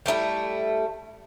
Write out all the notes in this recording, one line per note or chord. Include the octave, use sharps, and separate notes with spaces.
G3 A3 D#4 E4